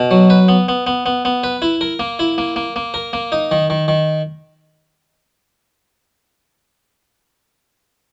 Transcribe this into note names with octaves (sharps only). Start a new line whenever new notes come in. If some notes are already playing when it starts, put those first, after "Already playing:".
Already playing: B2
F#3
B4
B3
B3
B3
B3
B3
B4
E4
A#4
A#3
E4
A#3
A#3
A#3
A#4
A#3
D#4
D#3
D#3
D#3